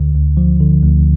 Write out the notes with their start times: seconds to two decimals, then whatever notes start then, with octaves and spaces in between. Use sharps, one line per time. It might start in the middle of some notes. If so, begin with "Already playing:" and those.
Already playing: D2 D3
0.14 D2
0.37 F3
0.60 D3
0.83 D2